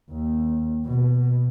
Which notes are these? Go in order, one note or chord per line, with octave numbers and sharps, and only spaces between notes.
D#2
B2